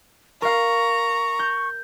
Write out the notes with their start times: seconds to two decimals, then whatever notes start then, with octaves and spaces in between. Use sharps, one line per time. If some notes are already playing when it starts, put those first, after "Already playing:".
0.42 A#4 F5 A#5 C#6
1.39 G6